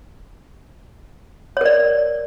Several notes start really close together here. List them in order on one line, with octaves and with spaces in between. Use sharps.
C#5 A#4 D5